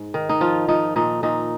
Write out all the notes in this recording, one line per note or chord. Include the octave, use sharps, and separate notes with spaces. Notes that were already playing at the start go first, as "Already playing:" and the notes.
Already playing: G#2
D#3
D#4
F3 F4
F3 D#4
A#2 D#4
A#2 D#4